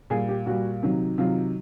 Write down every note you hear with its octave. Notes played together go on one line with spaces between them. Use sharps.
A#2 G3 G#4
G4
A#2 G3 F#4
C3 D#3 F#3
C3 D#3 F#3 F4